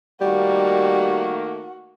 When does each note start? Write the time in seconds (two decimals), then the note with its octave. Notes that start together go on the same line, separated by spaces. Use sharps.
0.21 D#3 G3 A3 A#3 F#4